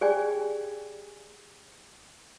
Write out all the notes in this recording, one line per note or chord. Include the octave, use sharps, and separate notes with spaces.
G4 G#4 C#5 D5 G5 G#5